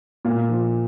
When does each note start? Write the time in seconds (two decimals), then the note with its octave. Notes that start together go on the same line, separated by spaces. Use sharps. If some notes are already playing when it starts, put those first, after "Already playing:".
0.25 A#2 F5
0.49 F3